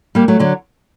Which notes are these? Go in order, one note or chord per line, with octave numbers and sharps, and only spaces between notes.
G3 A#3
F#3 A3
D3 F#3